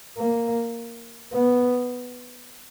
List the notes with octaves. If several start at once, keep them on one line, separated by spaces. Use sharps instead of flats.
A#3
B3